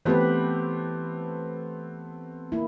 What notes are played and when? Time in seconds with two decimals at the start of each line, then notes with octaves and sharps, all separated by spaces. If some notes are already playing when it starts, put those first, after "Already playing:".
0.05 E3 A3 B3 C4 G4 B4
2.52 A#3 E4